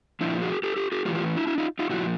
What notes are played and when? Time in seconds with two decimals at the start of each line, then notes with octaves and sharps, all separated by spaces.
0.21 A#2 F3 D4 E4
0.41 F#4 G#4
0.63 G4 A4
0.76 G4 A4
0.92 F#4 G#4
1.05 A2 E3 F4 G4
1.15 F4 G4
1.36 D4 E4
1.47 D4 E4
1.58 D#4 F4
1.79 D#4 F4
1.89 A#2 F3 E4 F#4